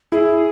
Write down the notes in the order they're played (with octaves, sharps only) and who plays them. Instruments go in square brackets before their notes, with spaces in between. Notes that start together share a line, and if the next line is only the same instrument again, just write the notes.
[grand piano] E4 [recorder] G#4